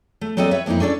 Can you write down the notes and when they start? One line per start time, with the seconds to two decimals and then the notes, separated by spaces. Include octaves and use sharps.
0.21 A3
0.37 F#3 A#3 C4 A4 D5 D#5
0.51 B4 C#5 E5
0.66 F2 A#3 C#4 D#4 E4
0.80 C#4 D4 A4 C5 D5